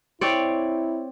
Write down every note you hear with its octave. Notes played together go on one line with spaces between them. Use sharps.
C4 E4 C#5 D5